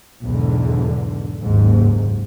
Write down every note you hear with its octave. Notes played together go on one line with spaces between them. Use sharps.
B1 E2 G#2 D3
F#1 D#2 G#2